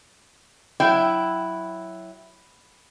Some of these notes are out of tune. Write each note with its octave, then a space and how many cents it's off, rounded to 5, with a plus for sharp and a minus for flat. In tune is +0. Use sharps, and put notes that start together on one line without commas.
F#3 +0 E4 +0 G5 -15